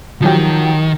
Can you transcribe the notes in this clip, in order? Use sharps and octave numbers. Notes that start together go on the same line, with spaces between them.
D#3 F3 F#3 G4